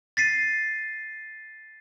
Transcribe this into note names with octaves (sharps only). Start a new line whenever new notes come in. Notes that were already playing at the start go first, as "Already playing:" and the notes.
A6 B6 C7 D#7